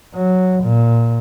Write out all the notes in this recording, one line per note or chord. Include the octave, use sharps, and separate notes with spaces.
F#3
A#2